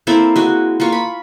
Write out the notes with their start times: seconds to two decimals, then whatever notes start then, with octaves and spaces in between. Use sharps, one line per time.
0.07 A#3 C4 E4 A4
0.36 G#3 F#4
0.80 A#3 F4 C#6
0.92 B5